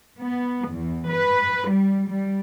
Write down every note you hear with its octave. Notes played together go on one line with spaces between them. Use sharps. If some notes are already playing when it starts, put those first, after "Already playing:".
B3
E2
B4
G3
G3